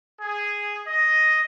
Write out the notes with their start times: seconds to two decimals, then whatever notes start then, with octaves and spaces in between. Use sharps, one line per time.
0.21 G#4
0.87 D#5